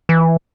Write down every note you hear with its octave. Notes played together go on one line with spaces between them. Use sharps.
E3